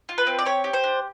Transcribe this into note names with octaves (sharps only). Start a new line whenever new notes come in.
F4
B4
C4
D5
G4 C#5
G4
C5
D4